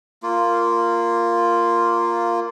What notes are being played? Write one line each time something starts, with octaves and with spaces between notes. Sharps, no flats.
A#3 F4